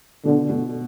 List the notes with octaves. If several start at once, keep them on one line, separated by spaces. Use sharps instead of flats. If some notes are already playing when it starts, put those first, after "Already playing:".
B2 D3
B2